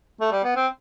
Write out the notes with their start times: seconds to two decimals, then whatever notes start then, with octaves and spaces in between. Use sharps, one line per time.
0.21 A3
0.31 G3
0.44 B3
0.56 C4